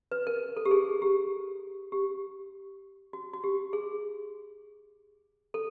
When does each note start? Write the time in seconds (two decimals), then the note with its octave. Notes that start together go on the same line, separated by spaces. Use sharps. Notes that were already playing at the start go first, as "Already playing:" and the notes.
0.11 B4
0.27 A#4
0.56 A4
0.65 G4
0.71 G#4
1.02 G4
1.92 G4
3.13 F#4
3.34 F#4
3.44 G4
3.73 G#4
5.54 A4